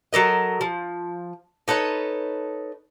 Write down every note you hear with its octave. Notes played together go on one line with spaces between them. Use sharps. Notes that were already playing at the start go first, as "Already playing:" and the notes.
F#3 A4 A#4 D#5
F3
D#4 A4 B4 C#5